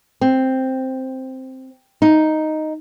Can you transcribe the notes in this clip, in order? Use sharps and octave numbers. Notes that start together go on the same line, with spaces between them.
C4
D#4